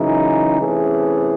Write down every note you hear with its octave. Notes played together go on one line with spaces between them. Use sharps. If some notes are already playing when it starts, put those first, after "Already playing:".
Already playing: F#2 C#3 E3 G#3 D#4
C3 E3 A3 C#4 G#4